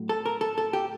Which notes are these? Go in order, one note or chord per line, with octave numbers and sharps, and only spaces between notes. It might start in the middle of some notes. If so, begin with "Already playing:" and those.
Already playing: A2 F#3
A4
A#4
A4
A4
G4